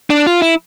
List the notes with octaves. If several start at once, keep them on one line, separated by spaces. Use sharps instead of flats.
D4
F4
E4